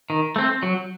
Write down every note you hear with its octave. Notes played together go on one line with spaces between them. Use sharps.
D#3
A3 C4
F#3